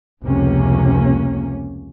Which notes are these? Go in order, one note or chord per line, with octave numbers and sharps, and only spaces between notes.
F1 C#2 C3 A#3 C#4